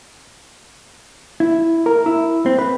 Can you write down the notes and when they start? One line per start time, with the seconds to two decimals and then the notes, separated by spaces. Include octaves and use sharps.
1.40 E4
1.86 A#4
2.06 E4
2.46 C4
2.59 B4